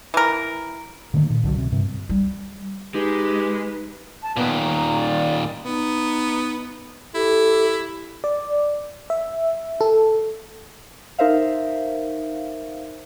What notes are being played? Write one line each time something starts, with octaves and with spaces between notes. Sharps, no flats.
E3 A#4
D3 D#3 A3 A#3
A#2
C2 D3 F#3
C3
G2 C3
G3
G#3 D#4 G4 B4
A5
A#2 D#3 B3
A#5
D5
B3 D#4
E4 G4 A4
D5
E5
A4
D#4 A#4 C5 E5 F5